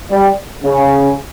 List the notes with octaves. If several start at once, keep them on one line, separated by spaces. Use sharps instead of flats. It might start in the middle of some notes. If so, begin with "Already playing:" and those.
G3
C#3